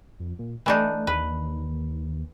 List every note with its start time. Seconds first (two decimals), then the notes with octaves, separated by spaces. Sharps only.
0.20 F2
0.39 A#2
0.66 E3 A3 D4 D#4
1.07 D#2 B4